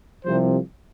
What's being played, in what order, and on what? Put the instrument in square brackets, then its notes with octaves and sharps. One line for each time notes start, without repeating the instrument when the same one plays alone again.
[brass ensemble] C2 C3 F3 C5